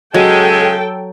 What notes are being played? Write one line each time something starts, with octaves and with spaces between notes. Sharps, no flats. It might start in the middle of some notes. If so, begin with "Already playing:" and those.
C#3 F#3 G#3 A4 G5